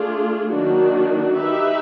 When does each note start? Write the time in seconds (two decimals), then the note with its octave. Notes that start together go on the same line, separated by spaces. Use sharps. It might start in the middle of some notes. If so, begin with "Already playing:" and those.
Already playing: A3 D4 F4 G#4
0.53 D#3 F#3 A#3 D4 F#4
1.40 D#4 G4 B4 E5